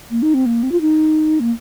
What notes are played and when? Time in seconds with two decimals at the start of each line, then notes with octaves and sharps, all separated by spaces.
0.11 A#3
0.22 D#4
0.34 C4
0.46 A#3
0.63 C4
0.72 F4
0.81 D#4
1.40 A#3